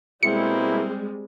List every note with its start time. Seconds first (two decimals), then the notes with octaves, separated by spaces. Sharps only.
0.23 B2 G3 G#3 A#3 C4 E4 C#7